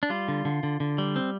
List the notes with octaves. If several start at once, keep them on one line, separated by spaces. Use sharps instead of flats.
D4
G3 F4
D3
D3
D3
D3
G3
C4